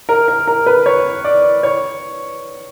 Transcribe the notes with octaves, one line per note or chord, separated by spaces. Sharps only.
A#4
A#4
A#4
B4
C#5
D5
C#5